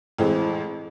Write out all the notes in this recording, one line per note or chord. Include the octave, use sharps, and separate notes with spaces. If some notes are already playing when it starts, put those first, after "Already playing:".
A1 F2 E3 G#3 C4